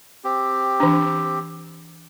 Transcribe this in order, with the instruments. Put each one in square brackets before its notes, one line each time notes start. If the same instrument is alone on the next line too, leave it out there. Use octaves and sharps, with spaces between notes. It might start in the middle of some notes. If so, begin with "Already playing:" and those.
[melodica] C4 G4
[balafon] E3 D4